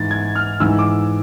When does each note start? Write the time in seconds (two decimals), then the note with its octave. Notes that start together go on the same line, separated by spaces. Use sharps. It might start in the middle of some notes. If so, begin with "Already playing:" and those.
Already playing: G#2 E3 A6
0.11 G#6
0.36 F6
0.60 G#2 E3 E6
0.79 D6